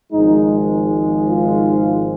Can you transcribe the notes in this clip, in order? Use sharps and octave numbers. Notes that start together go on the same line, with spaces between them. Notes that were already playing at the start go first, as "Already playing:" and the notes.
G#1 G#2 F3 G#3 D#4
F4